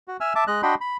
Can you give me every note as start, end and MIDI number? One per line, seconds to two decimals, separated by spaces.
0.08 0.17 66
0.21 0.33 76
0.21 0.33 80
0.21 0.33 88
0.21 0.33 89
0.35 0.44 76
0.35 0.44 81
0.35 0.44 86
0.47 0.62 56
0.47 0.62 75
0.47 0.62 90
0.63 0.75 62
0.63 0.75 66
0.63 0.75 75
0.63 0.75 79
0.63 0.75 83
0.63 0.75 84
0.81 0.97 83